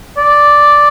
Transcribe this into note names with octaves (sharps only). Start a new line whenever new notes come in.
D5